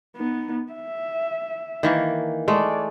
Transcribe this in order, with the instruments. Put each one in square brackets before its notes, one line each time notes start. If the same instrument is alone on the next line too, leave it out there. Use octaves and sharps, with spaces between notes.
[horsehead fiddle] B3 D#4
E5
[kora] D#3 E3 A#3
[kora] G#3 A3 [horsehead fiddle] D5